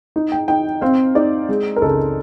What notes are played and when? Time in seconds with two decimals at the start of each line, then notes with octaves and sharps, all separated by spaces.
0.16 D#4
0.32 G5
0.48 D#4 G5
0.81 C4 F5
1.15 D#4 D5
1.49 G#3
1.76 A#4
1.82 C#2 A4